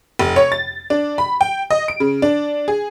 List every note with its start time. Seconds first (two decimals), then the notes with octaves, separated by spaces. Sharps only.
0.19 F1
0.36 C#5
0.52 A6
0.90 D4
1.18 B5
1.41 G5
1.71 D#5
1.88 D7
2.00 C#3
2.22 D4
2.68 G#4